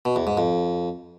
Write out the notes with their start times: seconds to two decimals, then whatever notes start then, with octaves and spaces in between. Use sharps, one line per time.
0.05 B2
0.16 E2
0.27 G#2
0.38 F2